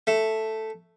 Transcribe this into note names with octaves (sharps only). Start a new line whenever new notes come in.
A3